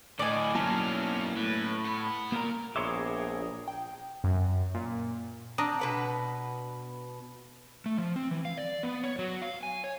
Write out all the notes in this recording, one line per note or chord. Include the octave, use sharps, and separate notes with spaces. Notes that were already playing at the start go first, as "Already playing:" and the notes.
A2 D3 D5 D#5 G#5
B2 F#3 A#3 C#4 E4 A#4 A5
A2 B4
B3 B5
A#2 A#3 A#4
A#1 B3 G#4 C#5 E5 A#5 C6 D6
G5
F#2
A#2
C4 D4 A#5 D6 D#6
B2 B4 F#5
A3
F3
C4
E3
F5
D5
B3
C#5
F#3
F5
G#5
C#5